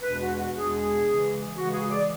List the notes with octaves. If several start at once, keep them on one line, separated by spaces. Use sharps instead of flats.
E2 B2 G#3 D4 B4
F#4
F#4
E2 B2 G#3 D4 G#4
C#3 E3 G#3
C#3 E3 G#3 F#4
G#4
D5